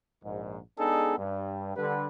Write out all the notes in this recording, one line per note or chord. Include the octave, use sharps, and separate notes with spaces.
A#1 G#2
G#3 B3 D4 D#4 G#4 A4
G2
D3 G3 B4